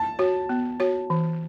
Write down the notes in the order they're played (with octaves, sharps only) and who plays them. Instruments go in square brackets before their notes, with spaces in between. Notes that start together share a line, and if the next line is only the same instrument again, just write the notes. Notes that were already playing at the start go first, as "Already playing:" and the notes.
Already playing: [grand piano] A5
[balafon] F#4 C#5
B3
F#4 C#5
E3